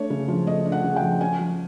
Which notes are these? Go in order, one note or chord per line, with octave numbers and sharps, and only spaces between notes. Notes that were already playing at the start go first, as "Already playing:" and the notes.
Already playing: A3 D4 C#5
C#3
F3
A3 D#5
D4
F#5
C#3
G5
F3
C#4 G#5
F3